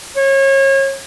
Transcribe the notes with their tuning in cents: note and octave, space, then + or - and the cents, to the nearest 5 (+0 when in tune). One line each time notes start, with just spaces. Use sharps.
C#5 -30